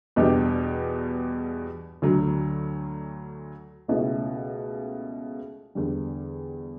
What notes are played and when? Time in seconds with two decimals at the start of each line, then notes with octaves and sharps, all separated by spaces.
0.16 E2 B2 G3 D4 G4
2.02 D2 D3 F#3
3.88 C#2 B2 A3 C#4 E4
5.75 E2 D3 G3